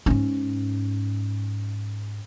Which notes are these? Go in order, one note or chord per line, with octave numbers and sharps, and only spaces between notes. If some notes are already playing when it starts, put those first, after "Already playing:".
G#2 C#4